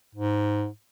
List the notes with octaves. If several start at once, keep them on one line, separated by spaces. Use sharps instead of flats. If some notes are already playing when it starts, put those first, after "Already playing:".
G#2